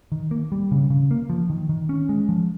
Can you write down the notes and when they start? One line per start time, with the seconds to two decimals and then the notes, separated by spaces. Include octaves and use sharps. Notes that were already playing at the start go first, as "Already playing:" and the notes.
0.12 D#3
0.31 A#3
0.52 G3
0.71 C#3
0.90 C#3
1.11 A#3
1.30 F3
1.50 D#3
1.69 D#3
1.89 C#4
2.09 G#3
2.29 F3